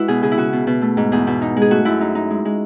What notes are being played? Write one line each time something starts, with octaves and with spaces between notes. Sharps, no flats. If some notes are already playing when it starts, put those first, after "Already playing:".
Already playing: G#3 E4 F#4 B4
B2 G#4
C#3 G#4
E4
C#3 F#4
B2
B2
A3
G#2
E2 G#4
B2
D#4
G#3
G#4
A3 F#4
F#2 E4
D#4
D#4
G#3
G#3